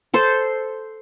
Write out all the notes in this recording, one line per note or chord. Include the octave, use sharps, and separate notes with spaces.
A4 C5